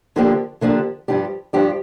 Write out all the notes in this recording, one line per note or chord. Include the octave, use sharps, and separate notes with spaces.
D3 F3 A#3 D4 G4
D3 F3 A#3 D4 G4
G2 F3 D4 G4
G2 F3 D4 G4